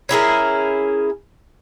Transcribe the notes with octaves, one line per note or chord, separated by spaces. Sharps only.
C#4 E4 G#4 A#4